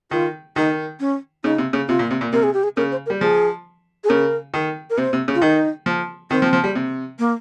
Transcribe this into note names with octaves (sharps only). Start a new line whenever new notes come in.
D#3 F4
D#3 D#4
C#4
C#3 D#4
C3
C#3
C3 F4
A#2
C3
A#2
C3 A#4
G#4
G4
G#4
C#3 A#4
C5
A#4
G3
F3 G#4
G#4
C#3 A#4
D#3
A#4
C3 C5
C3
C#3
F4
D#3 D#4
F3
D#3 C4
F3
F3
G3
C3
A#3